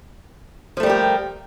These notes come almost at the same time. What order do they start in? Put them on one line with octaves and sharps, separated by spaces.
F3 A3 G3 A#4 G4